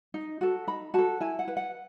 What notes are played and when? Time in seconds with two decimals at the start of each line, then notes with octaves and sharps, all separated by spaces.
0.14 D#4
0.41 F#4 A4
0.67 D#4 B5
0.94 F#4 A4 A5
1.21 E4 G#5
1.39 F#5
1.48 B4
1.57 F#5